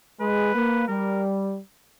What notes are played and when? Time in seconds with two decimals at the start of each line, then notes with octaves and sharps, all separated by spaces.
0.20 G#3 B4
0.54 A#3
0.87 G3 A#4